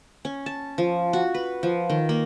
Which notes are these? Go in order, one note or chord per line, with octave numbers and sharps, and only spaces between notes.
C#4
A5
F3
F#4
B4
F3
D#3
A#3